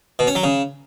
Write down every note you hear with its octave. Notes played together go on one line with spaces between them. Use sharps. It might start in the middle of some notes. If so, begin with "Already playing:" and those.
B2
C#4
F#3
C#3